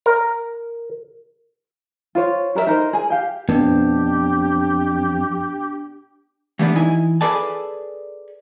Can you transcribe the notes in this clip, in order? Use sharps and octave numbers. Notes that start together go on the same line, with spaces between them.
A#4
F4 C5 C#5
G4 A#4 C5 E5
D#4 A#4 C5
G#4 G#5
G4 F5 G5
F2 B3 D4 G4
E3 G3 A3 B3 D4
E3 D#4 E4 G#5
G#4 A4 B4 D5 G#5 A5